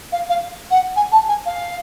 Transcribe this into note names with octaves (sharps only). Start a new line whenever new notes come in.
F5
F5
F#5
G#5
A5
G#5
F5